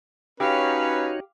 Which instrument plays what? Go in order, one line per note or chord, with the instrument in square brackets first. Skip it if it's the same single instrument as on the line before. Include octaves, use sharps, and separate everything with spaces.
[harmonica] C#4 B4 [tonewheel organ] D#4 F#4 C#5 [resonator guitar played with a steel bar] G4 [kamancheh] F5